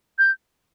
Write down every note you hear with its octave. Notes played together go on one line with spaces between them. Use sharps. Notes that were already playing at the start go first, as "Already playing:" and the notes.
G6